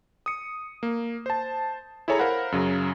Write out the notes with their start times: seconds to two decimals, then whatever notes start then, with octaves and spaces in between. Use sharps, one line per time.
0.26 D#6 C#7
0.83 A#3
1.26 C5 A5
2.08 E4 G#4 A4 C#5 G#5 A#5
2.19 A#4 C5 F5 F#5 B5
2.52 F#2 C#3 F#3